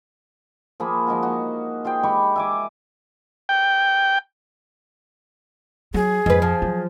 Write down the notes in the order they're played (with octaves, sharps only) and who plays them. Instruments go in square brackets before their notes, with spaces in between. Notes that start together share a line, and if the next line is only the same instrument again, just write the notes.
[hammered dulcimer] F3 A#3 G#4 B5
F3 G#3 D#4 F#4
D#4 F#4
F4 G#4 C5 G5
G#3 G4 B5 C#6
E5 G#5 D6
[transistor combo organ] G5
[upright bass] F#3 [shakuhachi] G#4
[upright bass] F2 [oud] G#2 B4
[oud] F3
[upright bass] F#3